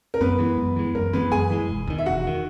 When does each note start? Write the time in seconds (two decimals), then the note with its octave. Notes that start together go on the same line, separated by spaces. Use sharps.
0.14 A#4
0.21 F#2 B3 B4
0.39 E3 G#3
0.58 F#2
0.76 E3 G#3
0.95 F#2 A#4
1.13 E3 G#3 B3 B4
1.32 F#2 G#4 G#5
1.50 E3 G#3
1.69 E1
1.87 E2 D#3
1.98 E5
2.06 E1 F#4 F#5
2.27 D#3